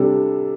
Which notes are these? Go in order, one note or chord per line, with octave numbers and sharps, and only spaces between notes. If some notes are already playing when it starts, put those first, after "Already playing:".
Already playing: C3 G3 D4 A4